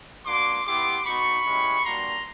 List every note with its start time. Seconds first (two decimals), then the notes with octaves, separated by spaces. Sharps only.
0.26 A#3 D4 F#4 C6 D6
0.66 B3 E4 G4 C6 D6
1.05 B3 D#4 F#4 B5 C#6
1.45 G#3 C#4 E4 G4
1.84 G3 A#3 D4 F#4 A#5 C6